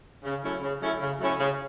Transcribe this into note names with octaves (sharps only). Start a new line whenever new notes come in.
C#3
F#3 A3 C#4 E4
C#3
F#3 A3 C#4 E4
C#3
F#3 A3 C#4 E4
C#3